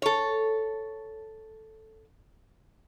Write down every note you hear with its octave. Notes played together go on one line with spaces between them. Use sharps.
A4 C#5